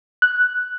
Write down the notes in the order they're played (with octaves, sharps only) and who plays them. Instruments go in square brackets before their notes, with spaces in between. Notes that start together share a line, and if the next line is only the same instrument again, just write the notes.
[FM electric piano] F#6